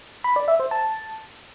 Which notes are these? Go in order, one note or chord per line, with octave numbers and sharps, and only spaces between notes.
B5
D5
E5
C5
A5